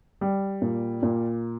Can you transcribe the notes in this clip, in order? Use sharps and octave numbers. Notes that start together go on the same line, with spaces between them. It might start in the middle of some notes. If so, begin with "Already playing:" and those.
G3
A#2
A#2